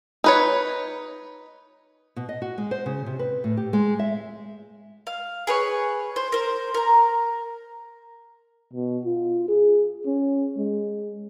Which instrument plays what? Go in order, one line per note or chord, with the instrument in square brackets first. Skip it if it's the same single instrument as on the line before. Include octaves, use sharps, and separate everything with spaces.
[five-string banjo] D#4 B4 C#5
[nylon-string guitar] B2
D#5
F#4
G#3
C5
C#3
C3
B4
A2
G4
G#3
E5
[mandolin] F5
G#4 B4 C#5
C5
A#4 C5
A#4 A#5
[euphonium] B2
F4
G#4
C#4
G#3